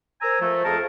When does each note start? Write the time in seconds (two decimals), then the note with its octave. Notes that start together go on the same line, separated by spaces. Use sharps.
0.21 A#4 C5 G#5 A#5 E6
0.40 F3 A3
0.65 F2 G#4 A#4 A5